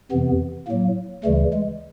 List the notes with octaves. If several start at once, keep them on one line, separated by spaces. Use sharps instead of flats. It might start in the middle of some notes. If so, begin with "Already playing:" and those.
F2 C3 E3 B3
A2 F#3 A#3
D2 C#3 E3 G3 A3
G#3